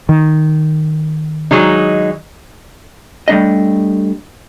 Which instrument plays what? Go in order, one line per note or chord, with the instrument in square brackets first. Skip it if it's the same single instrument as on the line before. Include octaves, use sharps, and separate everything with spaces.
[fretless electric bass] D#3
[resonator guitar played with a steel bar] F#3 G#3 D#4
[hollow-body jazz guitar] G3 A3 D4 D#5